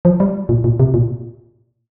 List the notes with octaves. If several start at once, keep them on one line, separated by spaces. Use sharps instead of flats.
F3
G3
A#2
A#2
C3
A#2